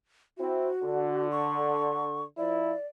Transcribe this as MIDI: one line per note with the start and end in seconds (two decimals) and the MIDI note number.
0.38 0.69 60
0.38 0.69 64
0.38 1.28 66
0.83 2.22 50
1.31 2.23 85
2.38 2.73 53
2.38 2.73 64
2.38 2.86 74